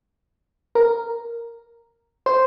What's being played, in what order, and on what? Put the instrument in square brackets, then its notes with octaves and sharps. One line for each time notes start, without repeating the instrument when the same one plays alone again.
[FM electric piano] A#4
C5